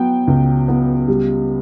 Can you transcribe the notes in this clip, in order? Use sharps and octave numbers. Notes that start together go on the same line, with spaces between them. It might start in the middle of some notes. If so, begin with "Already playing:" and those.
Already playing: F#3 B3 G5
C#2
B3
G3